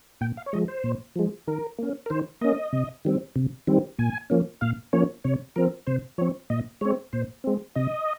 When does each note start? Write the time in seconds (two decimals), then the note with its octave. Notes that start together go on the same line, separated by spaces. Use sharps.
0.21 A#2 G5
0.37 F5
0.46 C#5
0.53 F3 G#3 D#5
0.68 C5
0.84 A#2
1.16 F3 G#3
1.47 D#3 A#4
1.78 A#3 C#4
2.06 A#4
2.10 D#3 C5
2.41 A#3 C#4 D#5
2.73 C3
3.05 D#3 G3 C4
3.36 C3
3.67 D#3 G3 C4
3.99 A#2 G#5
4.30 F3 A#3 C#4
4.61 A#2 F5
4.93 F3 A#3 C#4 C#5
5.24 C3 C#5
5.56 F3 C4 A#4
5.87 C3 C5
6.18 F3 C4 C#5
6.50 A#2 D#5
6.81 G#3 C4 C#5
7.13 A#2 C5
7.44 G#3 C4
7.75 C3 D#5